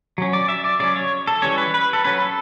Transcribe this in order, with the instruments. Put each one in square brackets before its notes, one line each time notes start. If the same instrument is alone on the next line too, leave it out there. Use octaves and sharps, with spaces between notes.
[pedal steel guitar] F#3 C#4
D5
E5
D5
C#3 F#3 C#4 D5
C#5
A4
E3 G3 C#4 C#5
B4
B4
A4
F#3 C#4 B4
A4